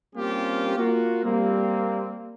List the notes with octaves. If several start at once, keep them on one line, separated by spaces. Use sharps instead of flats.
G3 A#3 C4 C#4 F4 G4
A#3 F4 F#4
G3 A#3 C4